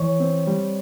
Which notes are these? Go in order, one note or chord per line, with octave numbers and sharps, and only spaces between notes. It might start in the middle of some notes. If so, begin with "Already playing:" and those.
Already playing: E3 C#5 C#6
C4
G3